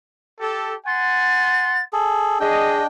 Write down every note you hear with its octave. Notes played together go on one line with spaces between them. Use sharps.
G4 A4
F#5 G#5 C6 A6
G#4 A4
D4 G#4 D#5 G5